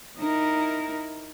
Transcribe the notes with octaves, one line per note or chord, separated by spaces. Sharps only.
D#4 E4 A#4